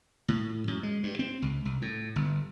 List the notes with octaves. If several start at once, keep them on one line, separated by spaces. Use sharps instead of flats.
A2
F#2
G#3
G2
C4
C#2
C2
A2
G1